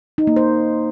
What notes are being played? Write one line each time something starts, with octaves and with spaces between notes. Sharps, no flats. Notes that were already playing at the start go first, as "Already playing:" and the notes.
D#4
A#3
C5